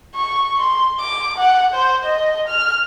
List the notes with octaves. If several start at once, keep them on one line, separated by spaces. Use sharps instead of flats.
C#6
C6
D6
F#5
C5
D#5
F6